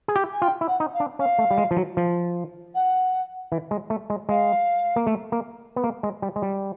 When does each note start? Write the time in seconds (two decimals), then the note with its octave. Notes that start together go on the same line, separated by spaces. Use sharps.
0.08 G#4
0.16 G4
0.31 G#5
0.42 F4 G5
0.61 E4
0.67 F#5
0.80 D#4
0.93 F5
1.00 D4
1.19 C#4 F5
1.39 A3
1.51 G3
1.58 G#3
1.71 F3
1.77 F#3
1.97 F3
2.74 F#5
3.52 E3
3.71 G#3
3.90 A3
4.10 G#3
4.29 G#3 F5
4.96 A#3
5.07 A3
5.32 A#3
5.76 B3
5.84 A#3
6.03 G#3
6.22 G3
6.36 G#3
6.42 G3